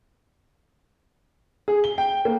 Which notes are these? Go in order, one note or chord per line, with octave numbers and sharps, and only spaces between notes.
G#4
G7
G5
A#3